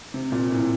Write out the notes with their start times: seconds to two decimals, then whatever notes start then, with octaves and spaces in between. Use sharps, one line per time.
0.14 C3
0.32 A#2
0.51 A2